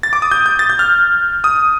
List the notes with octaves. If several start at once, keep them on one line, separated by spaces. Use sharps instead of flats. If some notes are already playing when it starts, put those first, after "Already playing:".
A6
D6
D#6
G6
G6
A6
G6
F6
D#6